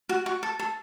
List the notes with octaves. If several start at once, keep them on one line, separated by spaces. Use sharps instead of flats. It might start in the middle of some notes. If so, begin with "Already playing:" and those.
F#4
F#4
A4
A4